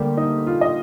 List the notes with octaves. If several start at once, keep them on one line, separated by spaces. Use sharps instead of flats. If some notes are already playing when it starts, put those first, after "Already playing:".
Already playing: D2 D3 G3 A#3 G4
D#4
F4
D#5